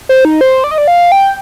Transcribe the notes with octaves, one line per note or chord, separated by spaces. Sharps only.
C5
D#4
C5
D5
D#5
D5
F5
G5